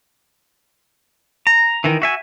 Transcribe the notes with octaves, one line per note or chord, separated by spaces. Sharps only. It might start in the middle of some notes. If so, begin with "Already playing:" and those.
A#5
D#3 E3
F#4 E5 G#5